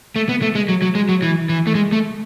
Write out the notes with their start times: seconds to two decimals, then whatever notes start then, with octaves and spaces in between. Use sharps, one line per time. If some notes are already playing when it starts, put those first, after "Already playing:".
0.16 A3
0.29 B3
0.42 A3
0.55 G#3
0.69 F#3
0.82 F#3
0.95 G#3
1.09 F#3
1.22 E3
1.49 E3
1.67 A3
1.75 G#3
1.92 A3